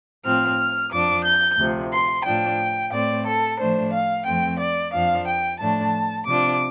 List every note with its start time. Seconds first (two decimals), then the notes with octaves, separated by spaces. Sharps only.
0.24 A2 F3 C4 F6
0.91 F2 F3 D4 D6
1.24 G6
1.58 D2 C3 F3
1.92 C6
2.25 A2 F3 D4 G5
2.92 A2 A3 C4 D5
3.26 A4
3.59 A2 F3 A3 D4 C5
3.93 F5
4.26 F2 F3 A3 C4 G5
4.59 D5
4.92 F2 F3 D4 F5
5.27 G5
5.60 A2 F3 A3 D4 A5
6.27 C3 F3 D4 D6